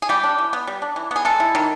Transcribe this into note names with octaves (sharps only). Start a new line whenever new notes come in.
G#4
G3 G4
D4
E3
B3
G3
D4
E3
B3 G#4
G#3 A4
E4
D#3